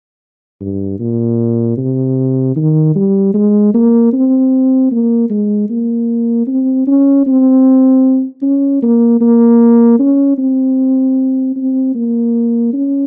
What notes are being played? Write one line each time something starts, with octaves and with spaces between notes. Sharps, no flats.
G2
A#2
C3
D#3
G3
G#3
A#3
C4
A#3
G#3
A#3
C4
C#4
C4
C#4
A#3
A#3
C#4
C4
C4
A#3
C#4